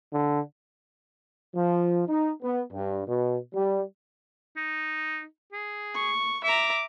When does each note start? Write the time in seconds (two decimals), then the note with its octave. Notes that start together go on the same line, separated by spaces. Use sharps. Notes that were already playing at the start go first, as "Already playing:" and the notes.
0.13 D3
1.55 F3
2.08 D#4
2.43 B3
2.71 G2
3.06 B2
3.54 G3
4.57 D#4
5.53 G#4
5.95 C#6
6.44 E5 A#5 D6